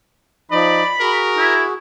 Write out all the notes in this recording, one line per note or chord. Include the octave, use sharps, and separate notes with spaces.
F3 D#4 D5 B5
F#4 G#4 A#4
E4